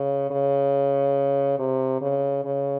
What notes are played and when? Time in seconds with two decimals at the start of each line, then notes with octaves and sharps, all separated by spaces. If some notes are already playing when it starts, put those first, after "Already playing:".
Already playing: C#3
0.30 C#3
1.59 C3
2.01 C#3
2.45 C#3